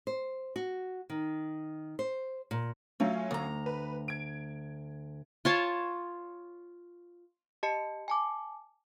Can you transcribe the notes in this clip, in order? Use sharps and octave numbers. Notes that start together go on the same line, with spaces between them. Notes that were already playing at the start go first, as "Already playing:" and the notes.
C5
F#4
D#3
C5
A#2
F#3 A3 C#4 F4
D2 A#5
B4
G#6 D7
F4 C#5 A5
G4 D#5 A5 C#7
G#5 A5 D6